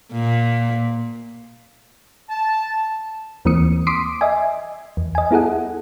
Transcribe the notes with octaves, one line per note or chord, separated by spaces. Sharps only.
A#2
A5
D#2 E3 A#3 C4 D#6 C#7
C6 D6 D#6 B6 C7 D7
D#5 E5 G#5
E2
D#5 G#5
B3 E4 G#4 A4 F#5